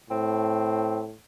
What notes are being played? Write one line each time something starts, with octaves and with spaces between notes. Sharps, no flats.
A2 C4